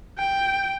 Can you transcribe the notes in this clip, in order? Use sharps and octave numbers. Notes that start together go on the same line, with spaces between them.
G5